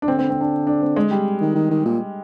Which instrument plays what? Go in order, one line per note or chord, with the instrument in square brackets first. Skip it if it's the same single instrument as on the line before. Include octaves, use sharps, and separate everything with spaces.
[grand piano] D4
[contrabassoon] D3 [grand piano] C4
[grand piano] C4
C4
D4
D4
C4
G#3
G3
[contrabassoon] D#3
D#3
D#3
A#2